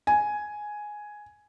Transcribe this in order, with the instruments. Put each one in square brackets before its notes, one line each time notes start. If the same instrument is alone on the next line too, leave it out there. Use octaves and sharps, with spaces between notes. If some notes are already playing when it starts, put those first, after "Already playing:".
[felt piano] G#5